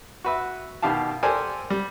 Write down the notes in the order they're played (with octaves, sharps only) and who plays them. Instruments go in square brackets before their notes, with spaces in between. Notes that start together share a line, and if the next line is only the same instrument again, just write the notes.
[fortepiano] F#4 B4 E5
B2 D#3 G4 F5 A5
G4 A4 A#4 C5 D5 G#5
G3